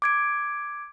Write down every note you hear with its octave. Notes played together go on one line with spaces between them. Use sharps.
D6 G#6 D7